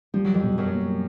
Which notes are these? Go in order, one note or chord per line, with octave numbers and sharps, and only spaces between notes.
F3 G3
F#3
F2 F3
B2
F#2 F#3
A#3